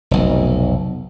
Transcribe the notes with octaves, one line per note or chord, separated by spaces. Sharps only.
F1 B1